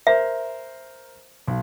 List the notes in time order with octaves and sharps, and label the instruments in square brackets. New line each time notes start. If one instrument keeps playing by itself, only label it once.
[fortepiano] A#4 C5 [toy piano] E5
[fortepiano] B1